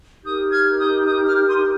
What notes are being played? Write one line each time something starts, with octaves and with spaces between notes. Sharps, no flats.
D#4 G4 A#4 D#6 G6
F6 G#6
D#6 G6
D#6 G6
D6 F6
C6 D#6